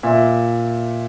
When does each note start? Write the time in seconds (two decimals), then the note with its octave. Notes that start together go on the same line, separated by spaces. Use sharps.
0.03 A#2 E5